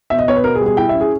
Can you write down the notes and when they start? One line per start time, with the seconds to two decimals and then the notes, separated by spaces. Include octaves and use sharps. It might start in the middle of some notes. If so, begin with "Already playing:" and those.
0.10 B2 E5
0.19 D#5
0.28 B3 C#5
0.36 B4
0.44 B2 A#4
0.55 G#4
0.61 G3
0.66 G#4
0.77 E4 G5
0.89 C#4 E5
1.01 G#4